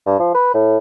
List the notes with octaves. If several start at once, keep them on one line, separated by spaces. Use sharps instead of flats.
G2
F3
B4
A2